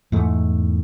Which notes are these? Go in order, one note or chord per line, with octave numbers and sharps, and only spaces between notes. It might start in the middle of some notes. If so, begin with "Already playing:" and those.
E2 G#2 A3